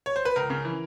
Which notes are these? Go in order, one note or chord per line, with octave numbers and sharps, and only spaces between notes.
C#5
C5
B4
C#2 A#4
C#3
E3